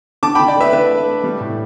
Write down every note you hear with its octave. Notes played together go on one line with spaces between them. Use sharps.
D3 A5 D6
G5 B5
D3
D5 G5
A3 B4 E5
D3 B4 E5
A3
A3
G3
A2